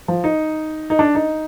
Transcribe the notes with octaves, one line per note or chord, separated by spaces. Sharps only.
F3
D#4
D#4
D4
D#4